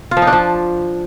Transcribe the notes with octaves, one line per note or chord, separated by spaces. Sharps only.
F4
F3
D#4
D4
F3